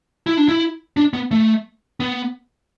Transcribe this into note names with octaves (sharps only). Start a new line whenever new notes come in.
E4
D4
E4
D4
B3
A3
B3